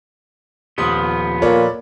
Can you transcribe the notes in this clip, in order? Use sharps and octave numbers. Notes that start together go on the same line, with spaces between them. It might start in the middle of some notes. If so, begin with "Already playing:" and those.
D#1 F3 B3 C6 D#6
A#2 A4 C#5 D5